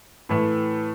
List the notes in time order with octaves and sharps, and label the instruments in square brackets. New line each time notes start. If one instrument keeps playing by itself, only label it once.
[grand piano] A2 E3 A3